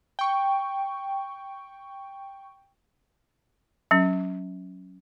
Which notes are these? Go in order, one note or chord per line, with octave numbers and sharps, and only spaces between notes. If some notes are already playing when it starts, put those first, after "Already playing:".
G5 C#6
F#3 C#4